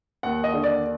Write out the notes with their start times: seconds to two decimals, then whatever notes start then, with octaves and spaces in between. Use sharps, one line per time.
0.23 D#2 F#5
0.44 D#5
0.54 D3
0.64 D5